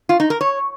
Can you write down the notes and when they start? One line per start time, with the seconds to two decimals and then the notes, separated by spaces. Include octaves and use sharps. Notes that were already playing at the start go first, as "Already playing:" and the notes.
0.09 F4
0.20 D#4
0.30 A#4
0.41 C#5